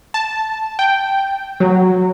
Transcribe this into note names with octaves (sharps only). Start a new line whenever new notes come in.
A5
G5
F#3